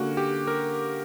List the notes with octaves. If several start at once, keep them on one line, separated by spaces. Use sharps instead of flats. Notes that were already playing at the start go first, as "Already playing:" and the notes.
Already playing: D3 G3 A#3 C#4 F#4
G4
A#4